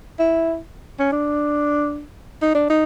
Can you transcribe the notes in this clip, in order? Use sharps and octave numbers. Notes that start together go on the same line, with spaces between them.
E4
C#4
D4
D#4
D4
D#4